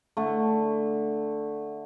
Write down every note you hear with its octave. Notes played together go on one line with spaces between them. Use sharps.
D3 A3